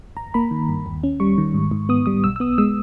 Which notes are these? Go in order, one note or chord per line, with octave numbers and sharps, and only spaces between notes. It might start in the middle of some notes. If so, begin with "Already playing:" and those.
G1 A#5
A#3 B5
D#3
G2
D#2
C#4
G3 C#6
D#3
G#2
G#2
B3 D#6
G3 D#6
B1 E6
E6
B3 D#6
G#3 E6